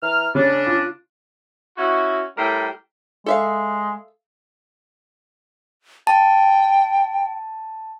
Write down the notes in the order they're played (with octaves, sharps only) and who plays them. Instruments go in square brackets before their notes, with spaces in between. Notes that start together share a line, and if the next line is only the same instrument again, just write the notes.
[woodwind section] E3 A#5 F6
[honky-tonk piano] C#3 [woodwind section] C#4 D4
[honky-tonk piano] F4
[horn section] C#4 E4 F#4
A2 G3 A#4 G5
[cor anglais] G#3 [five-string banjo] A4 E5 F5
[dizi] G5 [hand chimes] A5